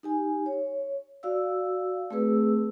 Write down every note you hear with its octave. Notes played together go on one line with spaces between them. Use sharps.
D#4 G4 G#5
C#5
F#4 D5 F5 E6
A3 C4 G#4 B4 E6